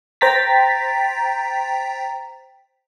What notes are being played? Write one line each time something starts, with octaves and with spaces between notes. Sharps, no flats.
C5 G5 A#5 A6 B6